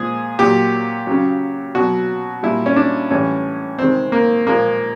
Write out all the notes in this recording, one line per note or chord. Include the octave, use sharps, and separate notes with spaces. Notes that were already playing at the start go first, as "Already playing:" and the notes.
Already playing: A#2 F3 G#3 G#4
A#2 F#3 G4
C#3 F#3
B2 F#3 F#4
A#2 G3 E4
C#4
D4
A2 E3 G3 C#4
C3 D#3 G#3 C4
A#3
A#2 F3 G#3 A#3